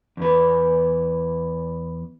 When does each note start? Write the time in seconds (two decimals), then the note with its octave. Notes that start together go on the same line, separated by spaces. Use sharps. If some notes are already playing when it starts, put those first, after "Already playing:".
0.17 E2 B4